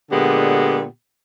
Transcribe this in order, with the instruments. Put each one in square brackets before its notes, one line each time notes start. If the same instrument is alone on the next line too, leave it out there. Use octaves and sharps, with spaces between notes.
[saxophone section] A#2 D3 G#3 B3 G4